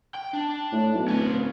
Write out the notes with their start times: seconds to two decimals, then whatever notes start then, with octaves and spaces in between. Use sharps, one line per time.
0.15 G5
0.34 D4
0.72 A2
0.94 B1
1.08 D1 C#4 B4